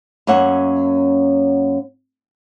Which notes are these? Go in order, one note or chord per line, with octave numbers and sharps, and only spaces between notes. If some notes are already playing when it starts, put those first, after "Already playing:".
F#2 A#3 C#4 E5 F#5